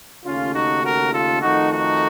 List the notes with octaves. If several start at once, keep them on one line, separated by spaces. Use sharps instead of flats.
D#2 C#3 A3 C#4 F4
D#4 F#4
F#4 A#4
F4 A4
F2 D#3 A3 D#4 F#4
D#4 F#4